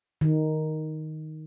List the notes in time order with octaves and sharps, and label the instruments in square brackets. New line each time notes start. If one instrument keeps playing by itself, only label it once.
[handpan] D#3